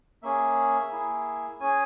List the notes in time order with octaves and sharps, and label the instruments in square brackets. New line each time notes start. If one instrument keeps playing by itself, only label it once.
[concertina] A#3 C#4 G#4 E5
A#3 E4 G#4
C#4 G#4 G#5